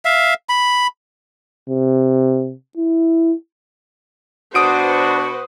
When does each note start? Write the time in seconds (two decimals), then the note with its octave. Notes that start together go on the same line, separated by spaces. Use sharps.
0.05 E5 F5
0.49 B5
1.69 C3
2.77 E4
4.55 B2 D4 F#4 B4 C5 D#6 D7